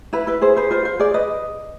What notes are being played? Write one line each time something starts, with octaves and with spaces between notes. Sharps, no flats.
E4 B4
E4 B4
G#4 C5
B4 C5
F4 C5
F4 C5
G#4 D5
B4 D#5